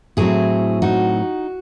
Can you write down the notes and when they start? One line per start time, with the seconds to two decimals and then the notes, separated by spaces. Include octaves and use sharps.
0.17 A2 F#3 C4 E4 G#4
0.82 D#4 F#4